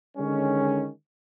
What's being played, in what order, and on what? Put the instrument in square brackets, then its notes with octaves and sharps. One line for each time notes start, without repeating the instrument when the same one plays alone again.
[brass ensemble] D3 D#3 G#3 C#4